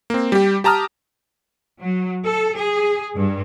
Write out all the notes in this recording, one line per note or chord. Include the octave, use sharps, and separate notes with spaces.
A#3 C4
G3 G4
G4 A5 A#5 D#6 F6
F#3
A4
G#4
G2